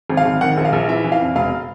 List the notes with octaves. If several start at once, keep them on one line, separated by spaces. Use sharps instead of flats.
G#1
F5
G#1
D#3 F#5
A#1
F5
A#1
E3 E5
E3
F5
F2
E1 F5